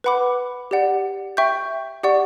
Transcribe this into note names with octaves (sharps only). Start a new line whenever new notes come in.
B4 F#5 B5 D6
G4 D5 F#5
E5 G5 C#6 G6
G4 D5 F#5 C#6